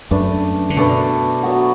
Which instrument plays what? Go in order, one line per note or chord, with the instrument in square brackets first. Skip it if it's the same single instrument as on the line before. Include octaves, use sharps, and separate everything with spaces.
[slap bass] F#2 [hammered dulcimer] A3 D4 B4
[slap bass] D3
[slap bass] B2 [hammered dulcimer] A3 D4 B4
[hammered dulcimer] F#3 B3 F#4